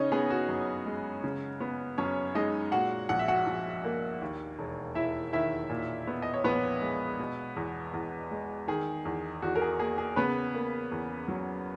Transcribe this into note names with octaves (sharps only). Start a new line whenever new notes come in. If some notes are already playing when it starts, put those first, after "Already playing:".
Already playing: C#3 C#4 D#4 C#5 D#5
B3 G#4
F#4
F#2
G#3
C#3
B3
F#2 C#4 C#5
G#3 D#4 D#5
A#2 F#4 F#5
A#1 F#5
E5
F#4 F#5
A#1
A#3
D#2
E1
E1 E4 E5
D#3 E4 E5
A#2
B3
D#5
C#5
A#1 B3 B4
G#3
B2
E2
E2
G#3
D#3 G#4
E2
E2 F#4
A#4
G#4
A#3 G#4
G#4
C#3 B3 B4
A#3
E2
F#3